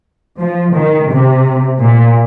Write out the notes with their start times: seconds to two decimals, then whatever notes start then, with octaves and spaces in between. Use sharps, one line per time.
0.40 F3
0.75 D#3
1.11 C3
1.80 A#2